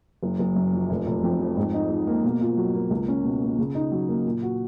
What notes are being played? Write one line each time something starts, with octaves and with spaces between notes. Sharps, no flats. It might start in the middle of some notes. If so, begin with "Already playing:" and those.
F#1
F#1
F#2
F3
F1
F1
F2
F3
G#2
D#4
F3
A#3
B2
F4
F#3
A#3
C#2
C#4
B2
A#3
C#3
D#4
F#3
A#3
A#2
F#4